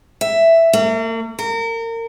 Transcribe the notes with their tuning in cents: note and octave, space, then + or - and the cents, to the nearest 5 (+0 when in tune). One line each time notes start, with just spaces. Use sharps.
E5 +5
A#3 -40
A#4 -30